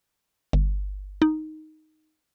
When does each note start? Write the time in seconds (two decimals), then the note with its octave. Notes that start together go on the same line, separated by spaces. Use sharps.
0.53 G1
1.22 D#4